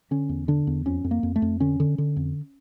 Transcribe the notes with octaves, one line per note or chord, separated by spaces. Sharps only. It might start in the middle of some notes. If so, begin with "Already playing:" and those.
D3 C#4
E2
D3 D4
E2
F2 C#4
F2
A#3
F2
A3
F2
D3 C#4
D3
D3
F2